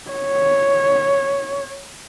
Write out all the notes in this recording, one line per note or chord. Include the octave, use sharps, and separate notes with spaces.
C#5